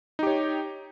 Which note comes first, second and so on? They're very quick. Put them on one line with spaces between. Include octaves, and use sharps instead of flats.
D#4 G4 C#5